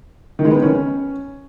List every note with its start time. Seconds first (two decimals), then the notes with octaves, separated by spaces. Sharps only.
0.39 D#3
0.45 G#3
0.51 B3
0.57 D#3
0.62 C#4